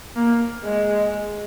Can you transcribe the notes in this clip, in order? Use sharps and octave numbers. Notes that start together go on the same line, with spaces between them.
A#3
G#3